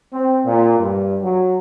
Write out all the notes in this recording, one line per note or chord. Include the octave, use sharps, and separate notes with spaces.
C4
A#2
G2
F#3